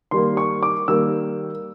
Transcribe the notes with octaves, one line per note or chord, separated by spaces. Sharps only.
D#3 G3 A#3 C6
C#6
D6
D#3 G3 A#3 E6